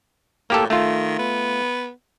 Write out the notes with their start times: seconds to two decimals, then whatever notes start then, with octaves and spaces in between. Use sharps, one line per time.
0.50 A2 A#3 G4 A4
0.70 D#3 A3 F4
1.19 B3